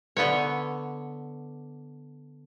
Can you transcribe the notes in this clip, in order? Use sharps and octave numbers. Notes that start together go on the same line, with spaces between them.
D3 B3 C#5